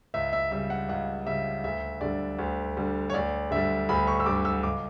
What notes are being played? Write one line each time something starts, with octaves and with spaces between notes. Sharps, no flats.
C#2 E5
E5
C#3 G3 E5
F#5
C#2 F#5
C#3 G3 E5
D2 E5
D3 G3 D5
D2
D3 G3
C#5
D2 D5
D3 G3 E5
D2 B5
C#6
E6
D3 G3 D6
E6
C#2 D6